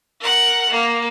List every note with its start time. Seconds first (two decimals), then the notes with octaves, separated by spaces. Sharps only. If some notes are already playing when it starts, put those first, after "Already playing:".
0.21 A#4 F#5
0.70 A#3